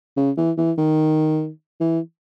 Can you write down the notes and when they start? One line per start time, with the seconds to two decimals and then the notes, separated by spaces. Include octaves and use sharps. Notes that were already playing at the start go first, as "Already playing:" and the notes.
0.17 C#3
0.37 E3
0.58 E3
0.78 D#3
1.81 E3